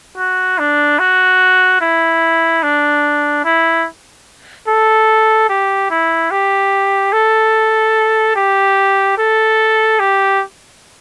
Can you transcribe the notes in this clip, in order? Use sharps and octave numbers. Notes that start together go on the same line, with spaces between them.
F#4
D4
F#4
E4
D4
E4
A4
G4
E4
G4
A4
G4
A4
G4